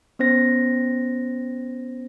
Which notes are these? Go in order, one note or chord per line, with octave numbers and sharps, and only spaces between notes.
B3 C#4 C5 A#6